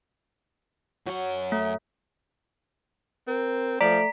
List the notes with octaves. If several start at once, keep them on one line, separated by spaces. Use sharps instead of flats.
F#2 F#3 F#5
A3
C4 A#4
F3 A3 D5 A#5 B6